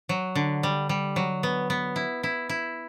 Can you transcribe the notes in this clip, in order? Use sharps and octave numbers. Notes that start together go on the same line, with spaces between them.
F#3
D3
G3
G3
F#3
B3
B3
E4
E4
E4